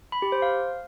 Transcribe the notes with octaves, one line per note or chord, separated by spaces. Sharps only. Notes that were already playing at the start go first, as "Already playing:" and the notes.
B5
G4
C5
F5